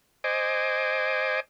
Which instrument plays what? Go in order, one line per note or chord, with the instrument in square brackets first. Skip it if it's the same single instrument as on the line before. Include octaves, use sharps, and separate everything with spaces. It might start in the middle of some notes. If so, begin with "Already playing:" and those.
[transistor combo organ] C5 D#5 G#5 D6